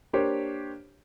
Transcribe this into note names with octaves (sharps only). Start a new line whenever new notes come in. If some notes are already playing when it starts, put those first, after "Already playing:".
A#3 D4 G4 C5 C#5